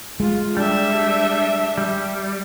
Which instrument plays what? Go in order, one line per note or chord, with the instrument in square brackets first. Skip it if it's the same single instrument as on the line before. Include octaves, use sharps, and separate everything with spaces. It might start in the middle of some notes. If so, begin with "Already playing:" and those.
[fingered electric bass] G#3 [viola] F4
[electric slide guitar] G3 [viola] D4 E5
[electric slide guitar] G3